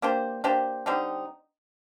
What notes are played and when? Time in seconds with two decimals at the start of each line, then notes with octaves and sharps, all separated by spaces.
0.02 A#3 D4 G4 C5
0.44 A#3 D4 G4 C5
0.86 D3 G3 C4 D#4